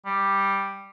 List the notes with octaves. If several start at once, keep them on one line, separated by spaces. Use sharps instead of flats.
G3